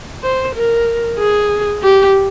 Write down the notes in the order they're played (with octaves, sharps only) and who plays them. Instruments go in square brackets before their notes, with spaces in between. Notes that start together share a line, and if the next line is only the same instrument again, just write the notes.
[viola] C5
A#4
G#4
G4